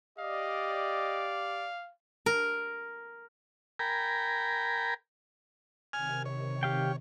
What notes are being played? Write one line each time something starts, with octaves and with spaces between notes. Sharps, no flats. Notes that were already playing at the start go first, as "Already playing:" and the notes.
G4 D5 D#5 F5
A#4
A#4 G5 G#5 A#5 B5
C3 D#3 G#5 F6
C#5
G4 F5 G5